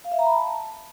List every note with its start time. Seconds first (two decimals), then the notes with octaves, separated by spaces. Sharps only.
0.05 F5
0.12 E5
0.19 A#5
0.26 B5
0.33 A5